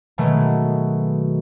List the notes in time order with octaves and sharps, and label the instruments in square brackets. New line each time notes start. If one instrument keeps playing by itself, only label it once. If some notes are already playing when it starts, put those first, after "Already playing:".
[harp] B2 D#3 F#3 G#3 A3